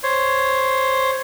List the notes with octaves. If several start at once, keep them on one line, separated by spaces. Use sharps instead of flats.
C5 C#5